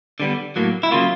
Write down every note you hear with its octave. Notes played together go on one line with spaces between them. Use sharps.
D3 G3 B3
A2 F#3 A#3
E4
C#3 F#3 A#3 F4